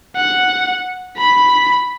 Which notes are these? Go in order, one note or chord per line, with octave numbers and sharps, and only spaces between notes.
F#5
B5